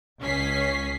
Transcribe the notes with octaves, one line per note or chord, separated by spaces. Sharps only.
C#2 C#4 B6 C7